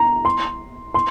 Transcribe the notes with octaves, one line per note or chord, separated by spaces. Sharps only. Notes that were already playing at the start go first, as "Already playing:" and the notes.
Already playing: A#5
C6
C6